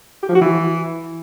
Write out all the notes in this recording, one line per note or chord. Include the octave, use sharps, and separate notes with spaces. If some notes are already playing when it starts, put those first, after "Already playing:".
G4
F3
F#4
E3